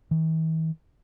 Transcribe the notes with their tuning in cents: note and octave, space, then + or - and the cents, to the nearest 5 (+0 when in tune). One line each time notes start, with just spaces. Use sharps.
E3 -45